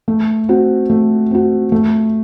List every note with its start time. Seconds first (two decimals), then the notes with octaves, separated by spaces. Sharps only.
0.08 A3
0.49 C4 F#4
0.90 A3
1.31 C4 F#4
1.72 A3